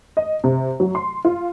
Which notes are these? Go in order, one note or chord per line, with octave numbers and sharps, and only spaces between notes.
D#5
C3
F#3
C6
F4